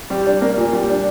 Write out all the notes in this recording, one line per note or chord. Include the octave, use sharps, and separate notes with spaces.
G3
D4
A#3
A#2
G3
D4